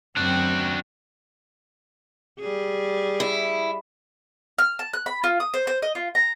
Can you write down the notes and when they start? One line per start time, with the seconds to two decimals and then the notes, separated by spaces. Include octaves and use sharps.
0.17 F#2 C4 D4 F#4 G5
2.40 G3 G#4
3.20 E4
4.58 F6
4.79 A5
4.93 F#6
5.06 B5
5.24 F4
5.40 D#6
5.54 C5
5.67 C5
5.82 D#5
5.95 F4
6.15 A#5